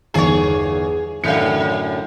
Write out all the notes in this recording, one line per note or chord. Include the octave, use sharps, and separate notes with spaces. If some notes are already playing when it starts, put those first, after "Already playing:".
G1 E2 D#3 G#4 C#5
F#2 A2 D3 D#3 F5 G6 C#7